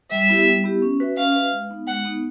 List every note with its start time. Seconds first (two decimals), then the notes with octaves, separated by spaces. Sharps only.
0.11 G3 E5
0.29 B3 E4 G4
0.47 G3
0.64 B3 E4 G4
0.82 C#4
1.00 F#4 B4 E5
1.17 C#4 F5
1.34 F#4 B4 E5
1.52 G#3
1.70 B3 D#4
1.87 G#3 F#5
2.05 B3 D#4